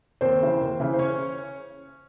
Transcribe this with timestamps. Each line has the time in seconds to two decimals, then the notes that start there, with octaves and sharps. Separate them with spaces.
0.21 D#2 C4 C5
0.41 C#3 E3
0.61 D#2
0.80 C#3 E3
0.93 C5
0.99 C#4 C#5